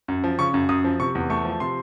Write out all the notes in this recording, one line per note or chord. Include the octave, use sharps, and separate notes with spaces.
F#2
F3
C#3 C#6
F#2
F#2 D#6
F3
C3 C#6
E2
A3 C#6
F3
C3 C6